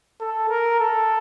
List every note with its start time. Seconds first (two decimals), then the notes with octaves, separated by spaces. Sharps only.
0.20 A4
0.50 A#4
0.80 A4